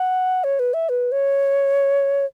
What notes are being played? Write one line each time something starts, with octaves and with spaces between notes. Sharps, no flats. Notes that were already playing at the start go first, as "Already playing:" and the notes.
Already playing: F#5
C#5
B4
E5
B4
C#5